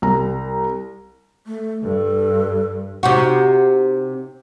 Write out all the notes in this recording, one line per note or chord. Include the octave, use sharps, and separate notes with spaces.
C2 A#5
A3
G2 A4
C3 D#4 F#4